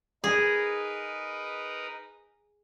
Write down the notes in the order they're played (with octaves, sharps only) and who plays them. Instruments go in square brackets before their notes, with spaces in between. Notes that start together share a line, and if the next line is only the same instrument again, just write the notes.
[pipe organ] D#4 A#4 B4 [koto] G#4